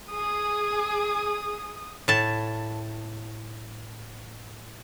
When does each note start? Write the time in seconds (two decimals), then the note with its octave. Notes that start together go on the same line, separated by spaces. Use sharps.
0.12 G#4 D#6
2.08 A2 A5